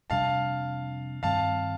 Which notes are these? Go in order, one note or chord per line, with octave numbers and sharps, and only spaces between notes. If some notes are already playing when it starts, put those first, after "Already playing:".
F2 C3 G3 D4 F5 A5
G2 D#3 G3 C4 F5 A5